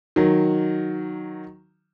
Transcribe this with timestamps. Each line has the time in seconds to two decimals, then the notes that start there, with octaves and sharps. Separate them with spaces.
0.16 D#3 F#3